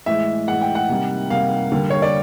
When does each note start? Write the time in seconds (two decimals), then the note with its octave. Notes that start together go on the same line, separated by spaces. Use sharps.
0.06 A2 E3 G#3 E5
0.48 A2 E3 G#3 F#5
0.61 G5
0.75 F#5
0.89 C3 D#3 G3 A#3
1.30 C3 D#3 G3 A#3 F5
1.72 D3 G3 A#3
1.90 C#5
2.02 D5